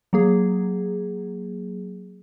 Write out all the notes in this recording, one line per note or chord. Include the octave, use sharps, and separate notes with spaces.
F#3 A#3 G#4